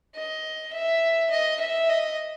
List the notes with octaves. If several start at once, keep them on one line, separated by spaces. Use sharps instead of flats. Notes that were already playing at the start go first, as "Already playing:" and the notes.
D#5
E5
D#5
E5
D#5